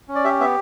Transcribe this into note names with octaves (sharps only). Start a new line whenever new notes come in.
C#4
D5
G4 E5
B3 E5